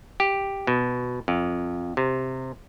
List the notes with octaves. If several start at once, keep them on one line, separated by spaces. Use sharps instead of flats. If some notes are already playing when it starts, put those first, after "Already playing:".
G4
B2
F2
C3